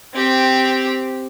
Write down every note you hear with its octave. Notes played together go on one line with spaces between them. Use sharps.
C4 G4